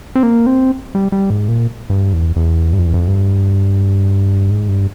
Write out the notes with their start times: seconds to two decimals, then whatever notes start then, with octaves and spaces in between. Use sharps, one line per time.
0.15 C4
0.23 A#3
0.46 C4
0.95 G3
1.12 G3
1.30 G#2
1.48 A#2
1.90 G2
2.13 E2
2.36 E2
2.73 G2
2.79 F2
2.86 E2
2.94 F2
3.08 G2
4.51 G#2
4.68 G2